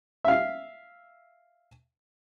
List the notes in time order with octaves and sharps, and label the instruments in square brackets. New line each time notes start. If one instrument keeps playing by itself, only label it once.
[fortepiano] E5 F5